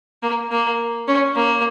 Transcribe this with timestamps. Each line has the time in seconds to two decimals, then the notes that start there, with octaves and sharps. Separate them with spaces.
0.23 A#3
0.51 A#3
1.08 C#4
1.36 A#3